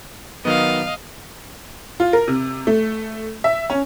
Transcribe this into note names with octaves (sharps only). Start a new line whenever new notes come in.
D#3 F#3 B3 D#5 F5
F4
A#4
C3
A3
E5
C#4